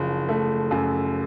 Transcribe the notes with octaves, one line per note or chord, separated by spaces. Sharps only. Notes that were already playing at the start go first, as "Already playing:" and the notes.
Already playing: F#1 F3
A3
F#2